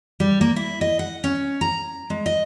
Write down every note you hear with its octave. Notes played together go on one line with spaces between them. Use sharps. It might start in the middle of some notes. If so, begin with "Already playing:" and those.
G3
A#3
E4
D#5
F#5
C#4
A#5
G#3
D#5